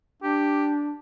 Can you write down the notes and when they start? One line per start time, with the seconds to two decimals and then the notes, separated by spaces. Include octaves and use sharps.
0.23 D4 G4